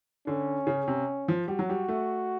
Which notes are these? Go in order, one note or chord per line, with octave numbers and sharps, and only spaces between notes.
D3 C#4
C#3
C3
F3
G3 F#4
F#3
G3
A3